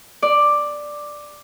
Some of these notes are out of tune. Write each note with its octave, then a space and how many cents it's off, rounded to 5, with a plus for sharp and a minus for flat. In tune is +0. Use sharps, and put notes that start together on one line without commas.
D5 +5